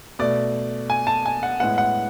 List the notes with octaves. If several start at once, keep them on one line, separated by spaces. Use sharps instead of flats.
B2 A3 D5
G#5
A5
G#5
F#5
A2 G#3 B3 F#5
F#5